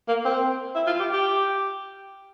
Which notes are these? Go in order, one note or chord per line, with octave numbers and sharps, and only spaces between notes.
A#3
C4
E4
F4
G4
G4